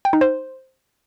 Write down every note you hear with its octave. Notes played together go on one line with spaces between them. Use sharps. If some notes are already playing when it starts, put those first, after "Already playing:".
G5
D#4
C5